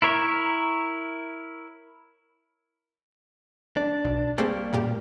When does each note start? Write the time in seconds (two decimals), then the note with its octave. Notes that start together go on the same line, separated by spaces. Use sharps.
0.02 E4 A#4 C#5 E5
3.77 D4
4.05 B1
4.38 G3 A3 A#3 C4 G#4
4.73 F#2 A#2 G4